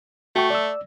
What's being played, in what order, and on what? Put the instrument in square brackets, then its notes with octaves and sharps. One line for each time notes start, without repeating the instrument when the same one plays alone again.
[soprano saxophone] A3 [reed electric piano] F#4 G5 C#6
[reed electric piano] D5 E6